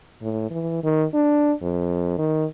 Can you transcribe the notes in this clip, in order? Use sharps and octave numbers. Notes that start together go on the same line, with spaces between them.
A2
E3
D#3
D4
F2
D#3